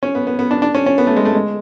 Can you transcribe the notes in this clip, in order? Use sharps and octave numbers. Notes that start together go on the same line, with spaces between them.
C#4
B3
B3
B3
D4
D4
C#4
C#4
B3
A3
G#3
A3
G#3